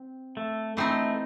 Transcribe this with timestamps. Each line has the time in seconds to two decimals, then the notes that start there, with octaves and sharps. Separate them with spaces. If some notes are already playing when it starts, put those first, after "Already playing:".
Already playing: C4
0.37 A3
0.77 E3 A3 C4 D#4